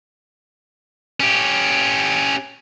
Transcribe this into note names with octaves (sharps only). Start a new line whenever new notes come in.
C#4 G4